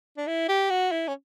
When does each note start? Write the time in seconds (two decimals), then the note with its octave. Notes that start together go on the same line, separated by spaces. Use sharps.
0.17 D4
0.27 E4
0.48 G4
0.70 F#4
0.91 E4
1.08 C#4